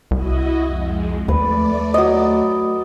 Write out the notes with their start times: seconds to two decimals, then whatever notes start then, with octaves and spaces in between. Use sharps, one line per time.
0.11 C2 E4 F#4 D#5
0.64 F2 G#3
1.28 D#2 A3 B4 D5
1.94 F#3 D#5